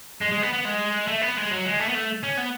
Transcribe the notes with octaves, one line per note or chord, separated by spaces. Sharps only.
G#3
G#3
B3
B3
G#3
A3
B3
G#3
F#3
G#3
A3
B3
A3
C#4
B3